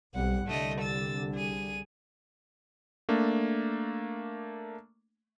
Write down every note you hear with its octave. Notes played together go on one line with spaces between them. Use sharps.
B1 G3 C4 F#5
C2 D3 G3 A3 D#5
E6 A6
G#4 D#7
A3 A#3 D4